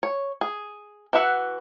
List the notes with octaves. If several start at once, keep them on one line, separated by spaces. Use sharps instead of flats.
C#5
G#4
E3 E4 F#4 E5 F#5